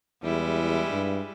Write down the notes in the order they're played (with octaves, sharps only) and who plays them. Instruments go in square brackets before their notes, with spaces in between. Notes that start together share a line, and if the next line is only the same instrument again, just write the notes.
[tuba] E2 [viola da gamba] G3 G#3 E4
[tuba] G2